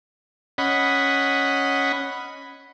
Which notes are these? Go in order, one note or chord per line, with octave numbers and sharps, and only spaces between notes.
C#4 D#5 F#5 B5